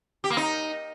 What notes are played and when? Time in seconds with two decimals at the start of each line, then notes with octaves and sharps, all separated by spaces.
0.24 G4
0.30 A#3
0.37 D#4